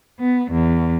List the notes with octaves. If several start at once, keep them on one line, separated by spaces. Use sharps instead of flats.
B3
E2